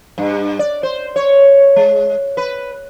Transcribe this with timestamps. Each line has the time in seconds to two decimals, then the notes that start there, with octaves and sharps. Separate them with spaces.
0.18 G2
0.59 D5
0.83 C5
1.16 C#5
1.76 G#3
2.37 B4